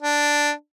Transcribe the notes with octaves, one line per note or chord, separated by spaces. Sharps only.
D4